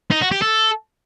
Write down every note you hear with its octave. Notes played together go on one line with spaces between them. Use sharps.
D#4
F#4
G4
A4